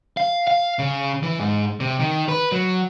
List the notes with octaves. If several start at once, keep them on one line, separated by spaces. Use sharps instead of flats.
F5
F5
C#3
E3
G#2
C3
D#3
B4
F#3